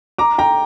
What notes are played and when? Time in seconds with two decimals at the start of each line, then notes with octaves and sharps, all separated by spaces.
0.18 A#5 D6
0.38 G5 A#5